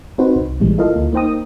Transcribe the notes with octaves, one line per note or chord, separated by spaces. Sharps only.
C4 D#4 F#4 B4 C5
C2
A#1 A#2 E3 G3 G#3
E4 F4 A4 A#4 D#5 F5
D2 A#3
A#3 D#4 C5 G5 A#5 D#6